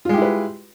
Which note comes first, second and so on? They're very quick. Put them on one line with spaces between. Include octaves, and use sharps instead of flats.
F4 G#3 G4 E4 B4